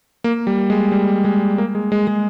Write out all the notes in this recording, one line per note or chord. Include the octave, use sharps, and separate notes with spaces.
A#3
G3
G#3
G3
G#3
A#3
G#3
G#3
G#3